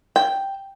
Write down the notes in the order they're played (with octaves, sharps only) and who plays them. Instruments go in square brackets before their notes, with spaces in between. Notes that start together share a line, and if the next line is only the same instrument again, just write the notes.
[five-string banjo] G5